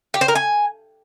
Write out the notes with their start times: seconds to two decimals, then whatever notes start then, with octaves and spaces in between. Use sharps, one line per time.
0.14 G4
0.21 C5
0.28 A#4
0.35 G#5